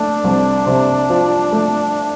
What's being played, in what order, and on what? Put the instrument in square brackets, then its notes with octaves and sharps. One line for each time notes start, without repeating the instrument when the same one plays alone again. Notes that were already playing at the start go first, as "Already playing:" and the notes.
Already playing: [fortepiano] A3 [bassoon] D4
[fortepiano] C2
C3
F3
A3